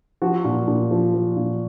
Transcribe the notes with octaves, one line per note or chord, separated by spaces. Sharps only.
F3 F#4
A#2
A#2
F3
F3
A#2